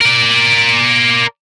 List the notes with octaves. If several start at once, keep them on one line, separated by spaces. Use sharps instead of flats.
A#4 D5